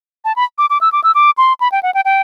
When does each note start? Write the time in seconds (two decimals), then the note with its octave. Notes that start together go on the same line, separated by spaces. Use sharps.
0.25 A5
0.36 B5
0.58 D6
0.70 D6
0.81 E6
0.93 D6
1.04 E6
1.15 D6
1.38 C6
1.60 B5
1.72 G5
1.83 F#5
1.94 G5
2.05 G5